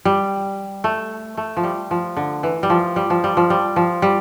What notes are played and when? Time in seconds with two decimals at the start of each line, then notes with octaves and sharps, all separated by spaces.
0.05 G3
0.84 A3
1.37 A3
1.57 F3
1.64 G3
1.91 F3
2.17 D3
2.43 E3
2.63 G3
2.70 F3
2.96 G3
3.10 F3
3.24 G3
3.37 F3
3.50 G3
3.76 F3
4.02 G3